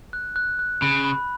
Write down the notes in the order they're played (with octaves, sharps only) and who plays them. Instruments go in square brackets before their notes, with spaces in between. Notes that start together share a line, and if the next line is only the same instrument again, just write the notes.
[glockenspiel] F#6
F#6
F#6
[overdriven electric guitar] C#3 [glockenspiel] B5
[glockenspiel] B5